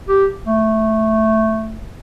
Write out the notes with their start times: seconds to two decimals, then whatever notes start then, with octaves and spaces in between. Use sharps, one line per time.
0.08 G4
0.46 A3